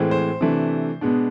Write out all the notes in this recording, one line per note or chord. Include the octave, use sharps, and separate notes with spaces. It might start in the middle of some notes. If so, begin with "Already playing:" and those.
Already playing: A2 E3 G#3 C4
C5
C3 E3 A3 D4
B2 G#3 B3 D4